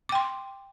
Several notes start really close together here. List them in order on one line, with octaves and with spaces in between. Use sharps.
D6 G5 C6